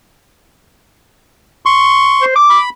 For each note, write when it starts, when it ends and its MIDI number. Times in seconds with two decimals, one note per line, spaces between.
1.66 2.25 84
1.66 2.25 85
2.21 2.33 72
2.36 2.58 86
2.50 2.69 83